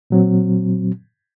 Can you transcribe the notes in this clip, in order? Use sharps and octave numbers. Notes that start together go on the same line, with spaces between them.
A#2 F#3 C4